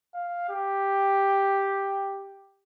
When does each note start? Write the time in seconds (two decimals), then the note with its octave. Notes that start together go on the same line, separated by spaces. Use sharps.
0.15 F5
0.49 G4